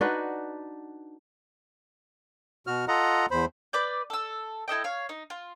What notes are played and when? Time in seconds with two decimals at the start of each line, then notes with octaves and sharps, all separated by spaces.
0.01 D4 D#4 F#4 B4
2.67 B2 F#4 F6
2.88 F4 A4 D#5 F#5 A#5
3.31 E2 C5 B5
3.73 B4 D5 G6
4.10 A4 E6
4.68 E4 A4 D#5 G5
4.84 C#5 F5
5.09 D#4
5.30 F4